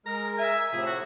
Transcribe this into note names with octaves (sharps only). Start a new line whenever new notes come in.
G#3 A#4 A#5
E5 G#5
A2 C3 F3 G#4
F#4